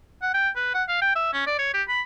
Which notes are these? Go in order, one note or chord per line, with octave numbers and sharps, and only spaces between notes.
F#5
G5
B4
F#5
F5
G5
E5
C#4
D5
C#5
G4
B5